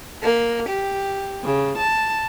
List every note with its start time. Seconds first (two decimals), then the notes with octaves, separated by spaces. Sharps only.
0.22 A#3
0.69 G4
1.45 C#3
1.79 A5